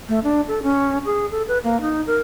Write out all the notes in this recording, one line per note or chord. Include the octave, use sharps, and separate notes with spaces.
A3
D4
A4
C#4
G#4
A4
B4
A#3
D#4
A#4